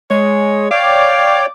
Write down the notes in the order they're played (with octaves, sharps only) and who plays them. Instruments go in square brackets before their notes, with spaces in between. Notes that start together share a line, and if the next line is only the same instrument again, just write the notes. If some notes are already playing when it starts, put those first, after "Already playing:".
[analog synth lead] G#3 [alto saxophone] C#5
[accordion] C#5 D5 G5 [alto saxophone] F5 [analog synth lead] D6